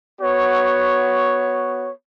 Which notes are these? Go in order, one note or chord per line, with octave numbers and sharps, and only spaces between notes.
B3 F#4 C#5